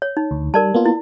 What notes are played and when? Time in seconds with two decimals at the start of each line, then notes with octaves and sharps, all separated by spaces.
0.02 C#5
0.17 D#4
0.31 D2
0.54 G3 A#4 D5 A5
0.74 A#3 B3 F4
0.86 E4